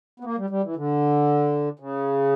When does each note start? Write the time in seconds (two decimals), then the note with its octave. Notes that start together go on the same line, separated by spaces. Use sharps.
0.20 B3
0.25 A#3
0.38 G3
0.50 G3
0.63 E3
0.76 D3
1.79 C#3